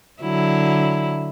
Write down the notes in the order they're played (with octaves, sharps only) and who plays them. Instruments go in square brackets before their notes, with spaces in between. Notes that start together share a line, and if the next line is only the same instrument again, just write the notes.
[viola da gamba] D3 F#3 E4